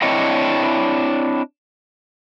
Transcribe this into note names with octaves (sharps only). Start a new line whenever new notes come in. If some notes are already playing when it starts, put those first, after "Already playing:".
C4 D4 E4 C#5 D#5 G5